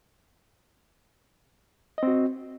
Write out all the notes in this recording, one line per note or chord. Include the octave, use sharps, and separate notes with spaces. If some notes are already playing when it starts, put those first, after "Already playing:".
C4 F#4 D#5